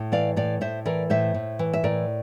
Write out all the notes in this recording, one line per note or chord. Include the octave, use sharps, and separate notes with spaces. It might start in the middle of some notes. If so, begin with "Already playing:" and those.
Already playing: A2
E3 D5 F5
A2 D5 F5
A2 C5 E5
E3 A#4 D5
A2 C5 E5
A2
E3
E5
A2 A#4 D5